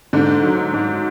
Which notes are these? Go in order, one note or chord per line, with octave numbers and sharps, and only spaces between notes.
G#2 D3
F#3
G#2